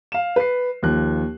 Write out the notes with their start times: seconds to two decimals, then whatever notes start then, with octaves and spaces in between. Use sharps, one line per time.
0.12 F5 E7
0.36 B4 C7
0.83 D#2 F3 F#6